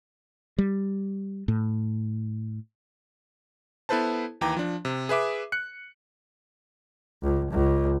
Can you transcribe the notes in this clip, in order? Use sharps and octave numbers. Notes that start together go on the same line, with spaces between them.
G3
A2
B3 E4 A4 B4 C5 A5
D#2 E3 G5 A#5 D6
F3 D4
C3
G#4 B4 E5 D6
F#6 C#7
C#2
C#2